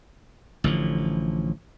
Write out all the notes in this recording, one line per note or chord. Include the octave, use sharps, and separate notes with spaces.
A1 D3 F3